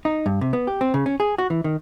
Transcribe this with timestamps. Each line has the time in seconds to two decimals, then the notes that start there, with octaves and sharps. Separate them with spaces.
0.05 D#4
0.26 G2
0.41 C3
0.53 B3
0.67 G4
0.81 C4
0.94 C#3
1.06 C#4
1.20 G#4
1.38 F#4
1.50 E3
1.64 D#3